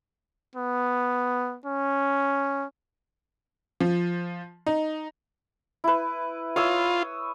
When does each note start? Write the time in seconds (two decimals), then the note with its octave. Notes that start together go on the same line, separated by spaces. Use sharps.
0.55 B3
1.66 C#4
3.80 F3
4.66 D#4
5.84 E4 B4
6.56 F4 C#5 D#6 E6